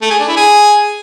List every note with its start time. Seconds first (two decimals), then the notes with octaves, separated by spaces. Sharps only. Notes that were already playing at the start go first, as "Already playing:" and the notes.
0.02 A3
0.10 G#4
0.19 D4
0.28 E4
0.37 G#4